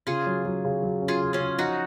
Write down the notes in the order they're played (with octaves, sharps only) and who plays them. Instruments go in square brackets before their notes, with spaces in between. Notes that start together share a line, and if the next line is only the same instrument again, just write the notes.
[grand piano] C#3 [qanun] F4 G#4
[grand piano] F#3
F#3
C#3
F#3
C#4
[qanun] F4 G#4
[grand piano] C#3
[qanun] C#4 F4
[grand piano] C#3
[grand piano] F3 [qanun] D#4 F#4